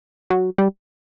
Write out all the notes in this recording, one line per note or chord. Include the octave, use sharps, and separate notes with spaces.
F#3
G3